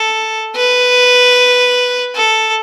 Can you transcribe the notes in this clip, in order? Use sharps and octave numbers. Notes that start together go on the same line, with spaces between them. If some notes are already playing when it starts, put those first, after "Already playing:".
Already playing: A4
B4
A4